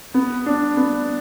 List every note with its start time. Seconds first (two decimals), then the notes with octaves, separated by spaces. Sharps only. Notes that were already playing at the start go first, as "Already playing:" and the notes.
0.14 B3
0.46 D4
0.77 B3